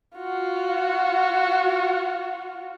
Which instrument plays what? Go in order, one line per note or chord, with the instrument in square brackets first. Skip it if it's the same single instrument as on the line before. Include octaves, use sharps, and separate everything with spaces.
[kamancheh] F4 F#4